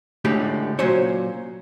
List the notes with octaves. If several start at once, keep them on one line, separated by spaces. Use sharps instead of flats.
C#2 A2 D3 G4
A#2 F#3 C#4 C5 C#5